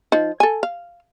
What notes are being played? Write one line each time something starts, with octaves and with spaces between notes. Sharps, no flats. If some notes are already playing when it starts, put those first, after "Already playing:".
F3 D#4
A4 G#5
F5